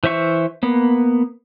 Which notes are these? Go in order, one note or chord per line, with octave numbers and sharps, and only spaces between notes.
E3 C5 E5 C#6
A#3 B3